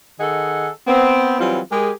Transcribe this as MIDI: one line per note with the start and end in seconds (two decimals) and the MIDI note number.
0.19 0.68 51
0.19 0.68 68
0.19 0.68 69
0.19 0.68 75
0.19 0.68 78
0.87 1.39 59
0.87 1.39 60
1.39 1.60 52
1.39 1.60 54
1.39 1.60 55
1.39 1.60 60
1.39 1.60 65
1.70 1.90 56
1.70 1.90 67
1.70 1.90 68
1.70 1.90 70